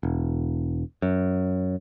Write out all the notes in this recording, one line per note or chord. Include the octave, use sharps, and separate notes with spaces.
E1
F#2